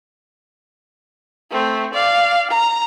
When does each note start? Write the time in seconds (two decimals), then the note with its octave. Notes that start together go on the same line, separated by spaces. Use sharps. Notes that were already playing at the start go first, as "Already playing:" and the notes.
1.51 A3 C4
1.94 D5 F5
2.51 A#5